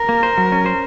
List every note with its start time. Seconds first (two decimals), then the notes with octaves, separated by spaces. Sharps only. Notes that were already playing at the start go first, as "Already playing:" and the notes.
Already playing: A#4
0.09 A#3
0.23 C5
0.38 F#3
0.52 C#4
0.66 C5